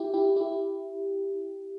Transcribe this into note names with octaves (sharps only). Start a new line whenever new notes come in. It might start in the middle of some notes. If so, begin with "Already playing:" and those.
Already playing: E4 G4
E4 G4
E4 G4